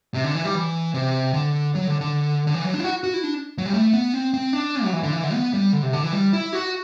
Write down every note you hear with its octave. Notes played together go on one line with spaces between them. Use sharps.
C3
D3
E3
G3
E3
C3
D3
F#3
D3
D3
D3
E3
F#3
D4
E4
F#4
F#4
E4
D4
F#3
G3
A3
B3
C4
C4
D4
F#3
E3
D3
E3
D3
B3
G3
D3
C3
D3
E3
G3
E4
F#4